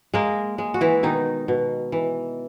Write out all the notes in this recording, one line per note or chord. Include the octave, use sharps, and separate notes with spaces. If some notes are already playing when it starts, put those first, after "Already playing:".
G#3 A#3 A#4
G#3
F#4
E3 E4
B2 D#3 D#4
B2
E3